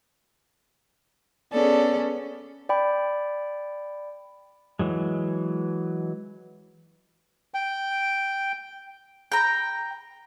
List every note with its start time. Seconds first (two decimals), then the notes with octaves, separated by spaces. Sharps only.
1.52 B3 C#4 G#4 A4 D5
2.69 D5 G5 B5
4.79 E3 F#3 G#3
7.54 G5
9.32 G5 A#5